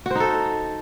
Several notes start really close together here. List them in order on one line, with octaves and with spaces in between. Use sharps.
F#4 C5 D#4 A4